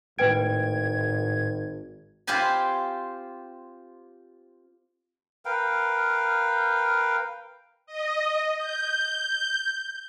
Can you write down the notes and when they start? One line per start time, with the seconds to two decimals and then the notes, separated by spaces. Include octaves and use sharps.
0.19 G#1 A2 B4 G5 G#6 D7
2.27 C4 F4 G4 G#5 B5
5.45 A#4 B4 F5 G5
7.86 D#5
8.58 G6